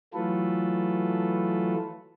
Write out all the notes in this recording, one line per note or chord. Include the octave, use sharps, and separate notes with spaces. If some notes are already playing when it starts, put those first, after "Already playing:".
E3 F#3 A3 F4 A4 B4